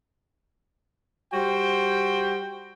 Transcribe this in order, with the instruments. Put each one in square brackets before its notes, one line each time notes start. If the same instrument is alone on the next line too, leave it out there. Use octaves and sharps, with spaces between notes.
[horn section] G3 F#4 C5 G5